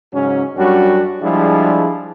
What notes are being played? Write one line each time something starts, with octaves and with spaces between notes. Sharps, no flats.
G#2 C#3 F#3 C#4
F#2 G3 C#4 D4 F#4
F3 G3 G#3 D4 E4 G#4